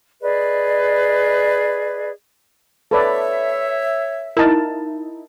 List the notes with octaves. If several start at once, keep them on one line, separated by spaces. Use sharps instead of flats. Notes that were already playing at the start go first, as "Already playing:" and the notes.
G#4 B4 D5 D#5
A4 B4 C#5 D5 E5
D#4 E4 A#4 A5